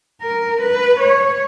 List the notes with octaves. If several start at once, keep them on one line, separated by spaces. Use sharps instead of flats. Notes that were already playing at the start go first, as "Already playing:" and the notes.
A#4
B4
C#5